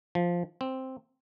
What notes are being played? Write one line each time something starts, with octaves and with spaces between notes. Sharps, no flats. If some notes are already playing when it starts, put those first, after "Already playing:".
F3
C4